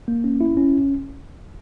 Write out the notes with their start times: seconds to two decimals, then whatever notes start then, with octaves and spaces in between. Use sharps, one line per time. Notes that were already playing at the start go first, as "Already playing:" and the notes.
0.08 A#3
0.24 C#4
0.41 E4
0.57 C#4